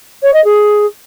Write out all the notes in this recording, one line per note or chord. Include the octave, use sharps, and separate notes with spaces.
C#5
D#5
G#4